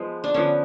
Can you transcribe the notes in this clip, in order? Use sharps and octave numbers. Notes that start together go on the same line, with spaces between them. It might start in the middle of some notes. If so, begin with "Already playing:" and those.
Already playing: F3 G#3 B3
D4
D3 F3 B3 C#4